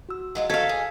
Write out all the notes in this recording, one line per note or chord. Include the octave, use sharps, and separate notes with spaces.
F#4 E6
F#3 G#3 F4
F2 F#3 D#4 A4 F5 G#6 B6
G#4